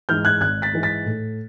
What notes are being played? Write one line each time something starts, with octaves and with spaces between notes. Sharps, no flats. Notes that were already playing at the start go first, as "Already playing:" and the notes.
G#2 E3 F6 G6
F#6 G#6
G#1 F#6 G#6
A6 B6
G#2 E3
A6 B6
A2